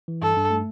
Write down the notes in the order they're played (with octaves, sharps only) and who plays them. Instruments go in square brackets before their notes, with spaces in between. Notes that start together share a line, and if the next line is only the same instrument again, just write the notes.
[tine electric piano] E3
[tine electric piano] G2 [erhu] A4
[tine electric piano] G2
A3